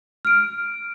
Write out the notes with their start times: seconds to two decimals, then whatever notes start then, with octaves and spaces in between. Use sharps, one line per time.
0.25 F6 D7